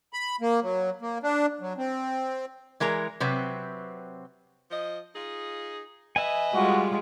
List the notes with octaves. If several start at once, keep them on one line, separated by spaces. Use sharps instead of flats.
B5
A#3
F#3
A#3
D4
F#3
C4
E3 G#3 A#4 A#5
C3 F#3 C4 B4
F3 D#5
D#4 F4 G#4
B4 D#5 E5 G#5
G3 G#3 F4 F#4